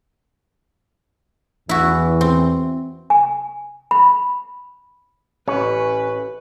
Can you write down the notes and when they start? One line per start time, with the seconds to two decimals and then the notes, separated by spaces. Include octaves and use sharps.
1.69 E2 E3 E4 F#4
2.21 C4
3.10 G#5
3.91 B5
5.48 A1 C#4 B4